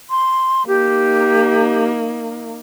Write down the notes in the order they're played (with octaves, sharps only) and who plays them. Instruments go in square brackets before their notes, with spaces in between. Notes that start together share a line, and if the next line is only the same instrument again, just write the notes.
[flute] C6
[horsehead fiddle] A#3 D#4 [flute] G4